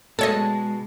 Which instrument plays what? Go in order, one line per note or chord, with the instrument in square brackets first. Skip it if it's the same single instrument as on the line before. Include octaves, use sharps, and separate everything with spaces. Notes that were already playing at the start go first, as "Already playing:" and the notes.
[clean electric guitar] B2 [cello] G#3 [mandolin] D4 A5 [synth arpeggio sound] A4 C#5 D#5